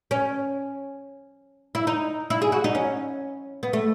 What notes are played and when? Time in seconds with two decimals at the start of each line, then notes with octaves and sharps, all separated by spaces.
0.11 C#4
1.75 E4
1.87 D#4
2.30 E4
2.42 G#4
2.52 F#4
2.64 D#4
2.75 C#4
3.63 B3
3.73 A3